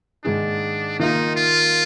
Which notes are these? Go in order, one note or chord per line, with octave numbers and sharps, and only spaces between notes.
G#2 D#3 G#3 D4 D#4 G#4
D#3 A#3 D#4 F4 A#4
F4